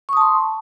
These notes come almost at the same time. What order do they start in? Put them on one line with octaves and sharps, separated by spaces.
C#6 D#6 A5 C6